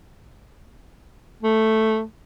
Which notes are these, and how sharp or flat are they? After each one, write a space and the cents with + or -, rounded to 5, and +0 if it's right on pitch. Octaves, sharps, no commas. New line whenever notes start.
A3 +0